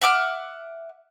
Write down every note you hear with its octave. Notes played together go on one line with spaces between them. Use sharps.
E5 F#5 D6 F6